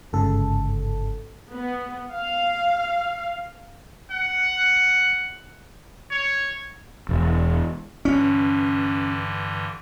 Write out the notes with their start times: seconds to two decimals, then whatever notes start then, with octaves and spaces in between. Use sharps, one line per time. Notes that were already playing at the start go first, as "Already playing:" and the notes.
0.13 G1 G#2 C#3 A4
1.51 B3
2.10 F5
4.11 F#5
6.11 C#5
7.09 E1
8.05 G2 D3 E3 C#4